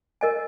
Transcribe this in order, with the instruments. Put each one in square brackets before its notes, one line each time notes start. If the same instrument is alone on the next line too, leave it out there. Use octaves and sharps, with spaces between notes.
[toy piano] A#4 D#5 G#5